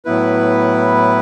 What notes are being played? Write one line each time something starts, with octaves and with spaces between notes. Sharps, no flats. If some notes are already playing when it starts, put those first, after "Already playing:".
A2 F#3 B3 E4 B4